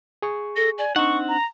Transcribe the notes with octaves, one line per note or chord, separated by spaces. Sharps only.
G#4 C#6
A4 A#6
D5 G#5
C4 D4 D#4 F#5 C#6
A#5